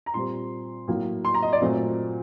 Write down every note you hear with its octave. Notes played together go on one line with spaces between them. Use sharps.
A#5
A#2 G3 C4 C6
A2 F#3 A#3
C6
A#5
D#5
D5
A#2 F#3 A3 C4